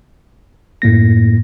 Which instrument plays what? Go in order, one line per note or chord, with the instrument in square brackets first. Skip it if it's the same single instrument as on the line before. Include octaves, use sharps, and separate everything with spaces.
[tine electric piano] F#2 A2 A#3 A#6